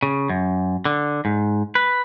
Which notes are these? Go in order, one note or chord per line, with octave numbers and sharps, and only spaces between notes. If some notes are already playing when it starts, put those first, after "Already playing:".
C#3
F#2
D3
G#2
B4